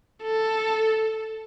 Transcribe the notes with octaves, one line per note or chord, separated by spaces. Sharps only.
A4